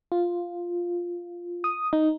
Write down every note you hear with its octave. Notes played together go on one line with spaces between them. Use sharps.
F4
D#6
D#4